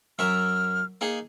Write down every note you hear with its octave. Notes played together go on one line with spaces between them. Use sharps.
F#2 A#4 E5 F6
A#3 D#4 G#4